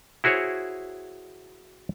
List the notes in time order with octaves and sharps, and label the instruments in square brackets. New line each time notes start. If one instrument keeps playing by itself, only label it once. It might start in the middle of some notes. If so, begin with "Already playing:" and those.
[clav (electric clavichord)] E4 F#4 G#4 C5 C#5